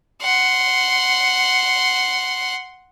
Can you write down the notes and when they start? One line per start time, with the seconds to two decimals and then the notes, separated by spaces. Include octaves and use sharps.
0.22 F#5 C6